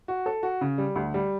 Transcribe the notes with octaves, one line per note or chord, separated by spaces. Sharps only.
F#4
A4
F#4
C#3
G3
D2
G3